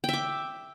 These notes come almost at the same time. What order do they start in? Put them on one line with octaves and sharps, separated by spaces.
G5 E5 D6